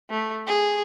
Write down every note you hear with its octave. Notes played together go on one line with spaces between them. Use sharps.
A3
G#4